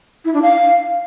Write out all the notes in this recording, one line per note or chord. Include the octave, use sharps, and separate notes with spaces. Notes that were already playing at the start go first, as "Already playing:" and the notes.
E4
D4
F5